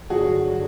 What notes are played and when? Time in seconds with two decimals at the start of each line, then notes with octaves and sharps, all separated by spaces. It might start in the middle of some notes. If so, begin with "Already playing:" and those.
0.10 G2 D3 F#3 F#4 G#4